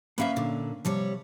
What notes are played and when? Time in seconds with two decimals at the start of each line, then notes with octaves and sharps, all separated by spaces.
0.18 A#3 C#4 B4 D5 E5 F5
0.36 A#2 D3
0.85 C3 F3 G3 C#5